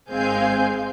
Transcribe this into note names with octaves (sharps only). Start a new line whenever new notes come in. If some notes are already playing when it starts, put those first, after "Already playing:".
G#1 G#3 C4 F5 G#5 G6